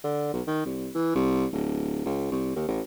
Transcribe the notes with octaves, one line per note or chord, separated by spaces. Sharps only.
D3
B1
D#3
C2
E3
C2
D1
C#2
C2
D#2
A1